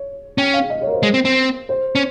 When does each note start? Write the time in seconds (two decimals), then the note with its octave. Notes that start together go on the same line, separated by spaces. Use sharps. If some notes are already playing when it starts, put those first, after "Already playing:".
Already playing: C#5
0.38 C#4 G5
0.53 F5
0.70 D#5
0.82 C#5
0.87 A#4
0.92 C5
1.03 G#3
1.14 C4
1.25 C4
1.69 C5
1.95 C#4